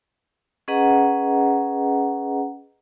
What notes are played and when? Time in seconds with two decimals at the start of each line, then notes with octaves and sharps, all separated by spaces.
0.68 C#4 G#4 B4 D#5 F#5 A#5